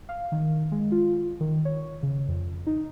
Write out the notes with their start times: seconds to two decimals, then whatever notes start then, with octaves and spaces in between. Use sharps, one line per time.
0.09 F5
0.32 D#3
0.72 G#3
0.92 F4
1.40 D#3
1.65 C#5
2.03 C#3
2.28 F2
2.67 D#4